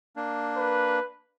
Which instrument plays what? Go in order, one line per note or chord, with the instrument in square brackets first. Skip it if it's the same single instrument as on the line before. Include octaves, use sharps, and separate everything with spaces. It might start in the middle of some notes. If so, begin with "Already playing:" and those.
[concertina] A#3 D4
[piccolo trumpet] B4